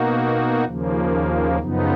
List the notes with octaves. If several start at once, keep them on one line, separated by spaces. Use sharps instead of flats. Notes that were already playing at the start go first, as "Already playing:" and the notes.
Already playing: B2 A#3 D#4 F#4
D#2 C#3 F3 A#3
F#2 C#3 F3 B3 D#4